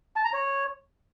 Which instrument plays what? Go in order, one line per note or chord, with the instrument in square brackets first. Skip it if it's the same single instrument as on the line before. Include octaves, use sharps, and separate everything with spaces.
[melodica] A5
A#5
C#5